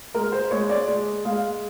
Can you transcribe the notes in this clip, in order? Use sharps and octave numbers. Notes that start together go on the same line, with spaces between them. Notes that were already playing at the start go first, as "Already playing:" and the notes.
G#3 A#4
C5
G#3 C#5
D5
G#3
G#3 F5